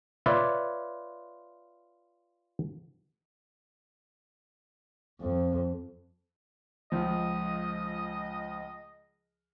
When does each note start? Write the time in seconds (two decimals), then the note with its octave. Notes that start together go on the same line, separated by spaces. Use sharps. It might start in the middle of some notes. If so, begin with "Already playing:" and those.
0.26 F4 B4 C#5 D5 E5
5.20 F2
6.92 C#2 F3 D#5